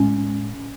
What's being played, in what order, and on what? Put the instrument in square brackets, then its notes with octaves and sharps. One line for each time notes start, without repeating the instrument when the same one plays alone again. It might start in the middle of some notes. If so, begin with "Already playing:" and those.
Already playing: [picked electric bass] A2 G#3 C#4